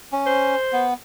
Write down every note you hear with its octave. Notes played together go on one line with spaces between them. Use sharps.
C#4
C5
B3